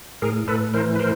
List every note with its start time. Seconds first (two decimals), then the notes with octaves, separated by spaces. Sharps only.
0.22 A2 G#4 A#4
0.48 A2 A4 B4
0.74 E3 A#4 C5
0.95 B4
0.99 E3 A#4 C5